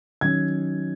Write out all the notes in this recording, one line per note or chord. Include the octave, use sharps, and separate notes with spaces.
D#3 F#3 C#4 G#6